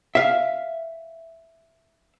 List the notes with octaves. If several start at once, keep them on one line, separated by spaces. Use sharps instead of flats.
E5 F5